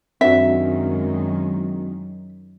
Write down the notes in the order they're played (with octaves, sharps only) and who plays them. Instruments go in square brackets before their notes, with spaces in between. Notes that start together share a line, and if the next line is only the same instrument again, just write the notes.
[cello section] F#2 D#3 G#3 [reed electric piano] C4 D4 F#4 [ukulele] E5